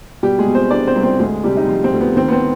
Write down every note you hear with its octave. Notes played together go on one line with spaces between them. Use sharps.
B2 G3 G4
G#3 G#4
B2
C4 C5
C2 D4 D5
C4 C5
C2
C4 C5
D2 G#3 G#4
C3 G3 G4
D#4
F3 F4
C4
D2
B3
D#3 C4
B3
C4